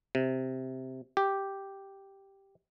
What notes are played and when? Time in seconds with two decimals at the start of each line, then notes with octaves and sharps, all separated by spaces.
0.15 C3
1.17 G4